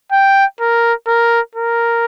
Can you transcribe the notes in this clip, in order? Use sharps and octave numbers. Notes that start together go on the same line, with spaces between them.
G5
A#4
A#4
A#4